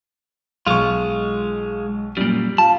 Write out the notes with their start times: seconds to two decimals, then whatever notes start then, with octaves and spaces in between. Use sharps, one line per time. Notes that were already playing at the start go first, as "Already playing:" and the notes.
0.67 B1 G#3 F4 C#6
2.17 F#2 A#2 G3
2.58 F4 A5